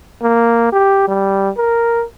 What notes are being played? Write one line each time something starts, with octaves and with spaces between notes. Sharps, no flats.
A#3
G4
G3
A#4